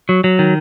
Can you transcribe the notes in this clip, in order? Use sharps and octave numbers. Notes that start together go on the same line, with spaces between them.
F#3
F#3
D#3